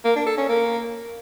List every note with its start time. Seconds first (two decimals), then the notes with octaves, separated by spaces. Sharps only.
0.05 A#3
0.16 D4
0.27 A4
0.38 C#4
0.49 A#3